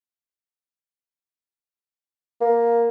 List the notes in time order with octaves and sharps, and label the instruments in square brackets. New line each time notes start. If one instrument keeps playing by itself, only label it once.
[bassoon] A#3